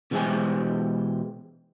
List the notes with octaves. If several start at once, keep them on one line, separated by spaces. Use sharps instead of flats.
B2 E3 G#3 G4 C5 G#5